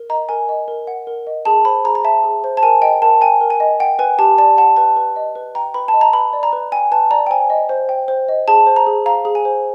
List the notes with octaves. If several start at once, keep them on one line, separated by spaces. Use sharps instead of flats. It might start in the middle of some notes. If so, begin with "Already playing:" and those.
Already playing: A#4
D#5 A#5
A#4 G#5
D#5
A#4
F#5
A#4
D#5
G#4 A5
C5 B5
G#4 A#5
A#5
E5 A5
G#4
C5
A5
A#4 G#5
D#5 G5
A#4 A5
G5 G#5
A#4
G#5
D#5
F#5 G5
B4 G#5
G4 A5
D5 A5
F#5 A5
B4 A5
B4
D#5
B4
G5 A#5
B4 B5
A5
D#5
A#5
B4 B5
D5
A#5
B4
G5 G#5
B4 A5
D5 A#5
G5
C5 G#5
D#5
C5
G5
C5
D#5
G#4 A5
C5
A#5
G#4
F5 A#5
G#4
G#5
C5